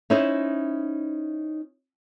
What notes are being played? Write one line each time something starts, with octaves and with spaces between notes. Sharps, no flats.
C#4 D#4 E4 C5 D#5